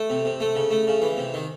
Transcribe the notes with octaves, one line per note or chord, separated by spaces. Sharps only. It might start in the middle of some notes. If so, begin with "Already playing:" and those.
Already playing: A3
C3
C3
A3
C#3
A3
C#3
E3
C3
D#3